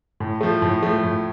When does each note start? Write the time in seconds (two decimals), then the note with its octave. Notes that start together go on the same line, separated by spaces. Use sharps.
0.20 A2
0.41 F3 A3
0.62 A2
0.83 F3 A3
1.04 A2